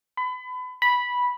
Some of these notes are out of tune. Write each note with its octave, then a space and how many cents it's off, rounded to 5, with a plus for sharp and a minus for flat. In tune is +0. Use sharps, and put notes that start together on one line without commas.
B5 +30
B5 -10